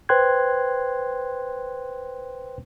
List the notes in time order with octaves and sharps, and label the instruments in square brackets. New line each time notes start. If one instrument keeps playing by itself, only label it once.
[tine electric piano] B4 C5 G5 C6 F#6 G#6